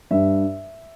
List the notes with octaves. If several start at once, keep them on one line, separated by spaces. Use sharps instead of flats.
G2 E5